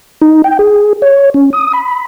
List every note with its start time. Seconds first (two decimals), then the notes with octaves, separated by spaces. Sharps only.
0.22 D#4
0.44 G5
0.59 G#4
1.02 C#5
1.34 C#4
1.53 D#6
1.73 B5